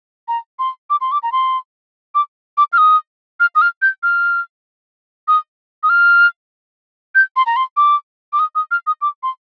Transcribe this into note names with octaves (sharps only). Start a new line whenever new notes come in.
A#5
C6
D6
C6
D6
A#5
C6
D6
D6
F6
D#6
F6
D#6
F6
G6
F6
D#6
D#6
F6
G6
C6
A#5
C6
D6
D6
D#6
D#6
F6
D#6
D6
C6